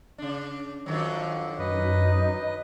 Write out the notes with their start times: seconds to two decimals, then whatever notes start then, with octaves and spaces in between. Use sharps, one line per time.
0.18 C#3 D4
0.86 F2 D3 D#3 F#3
1.59 F#2 D#4 B4 D#5